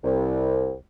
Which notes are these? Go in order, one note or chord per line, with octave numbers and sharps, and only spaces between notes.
C2